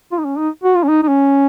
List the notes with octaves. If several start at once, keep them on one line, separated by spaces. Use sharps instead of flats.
F4
D#4
C#4
D#4
F#4
F4
C#4
D#4
D#4
C#4